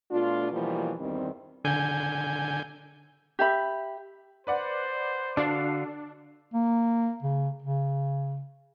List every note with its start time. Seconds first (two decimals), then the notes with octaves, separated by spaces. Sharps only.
0.11 B2 A3 D4 F4
0.52 B2 E3 F3 G3 A#3 B3
0.99 E2 G2 D#3 G3 C4
1.65 D3 G#5 G6
3.39 G4 E5 B5
4.47 B4 C5 D5 F#5
5.37 D3 D4 F#4 F5
6.54 A#3
7.22 C#3
7.62 C#3